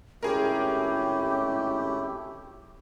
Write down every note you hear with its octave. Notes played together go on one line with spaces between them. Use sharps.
G#1 A2 A3 C#4 E4 G4 G#4 A#4